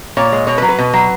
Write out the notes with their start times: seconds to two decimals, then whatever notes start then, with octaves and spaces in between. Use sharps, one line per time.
0.17 A#2 C#5
0.32 G#3
0.47 B2 C#5
0.58 B4
0.62 F#3
0.69 B4
0.78 B2
0.93 F#3